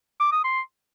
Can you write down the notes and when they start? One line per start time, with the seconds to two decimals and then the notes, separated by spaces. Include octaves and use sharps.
0.20 D6
0.32 D#6
0.44 C6